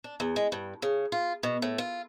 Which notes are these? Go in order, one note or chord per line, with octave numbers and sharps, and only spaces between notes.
D4
E2
G#3
G2
C#3
F4
B2
A2
F4